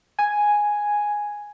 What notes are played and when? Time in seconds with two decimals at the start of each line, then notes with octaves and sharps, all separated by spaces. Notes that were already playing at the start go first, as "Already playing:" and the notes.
0.19 G#5